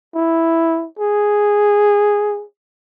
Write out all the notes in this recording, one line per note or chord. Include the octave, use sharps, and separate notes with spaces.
E4
G#4